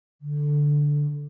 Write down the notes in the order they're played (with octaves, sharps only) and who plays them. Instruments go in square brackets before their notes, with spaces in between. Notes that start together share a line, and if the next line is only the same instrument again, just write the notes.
[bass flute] D3